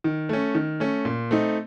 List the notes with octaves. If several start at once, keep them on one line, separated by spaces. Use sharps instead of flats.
D#3
A3 C#4
D#3
A3 C#4
A#2
A3 C4 D#4